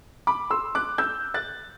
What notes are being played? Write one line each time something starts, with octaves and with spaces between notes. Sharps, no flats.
B5 D6
C6 E6
D6 F#6
E6 G6
F#6 A6